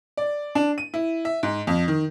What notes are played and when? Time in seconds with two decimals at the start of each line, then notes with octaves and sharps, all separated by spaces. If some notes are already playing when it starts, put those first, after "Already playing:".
0.17 D5
0.55 D4
0.78 D#7
0.94 E4
1.25 E5
1.43 G#2
1.67 F2
1.88 D#3